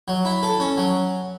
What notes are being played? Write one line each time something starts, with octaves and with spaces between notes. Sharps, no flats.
F#3
E4
A4
C#4
F#3